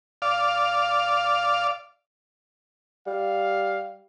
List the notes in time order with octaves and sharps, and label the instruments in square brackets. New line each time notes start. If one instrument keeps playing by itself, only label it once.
[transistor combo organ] D5 F5
[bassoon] G3 [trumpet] F5